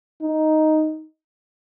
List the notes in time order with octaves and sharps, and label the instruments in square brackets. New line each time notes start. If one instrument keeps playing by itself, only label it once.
[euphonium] D#4